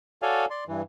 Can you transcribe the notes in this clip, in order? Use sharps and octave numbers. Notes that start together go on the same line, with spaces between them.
F#4 A4 C#5 D5 F5 G#5
D5 C6
G2 E3